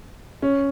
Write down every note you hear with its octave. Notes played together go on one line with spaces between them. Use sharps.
C#4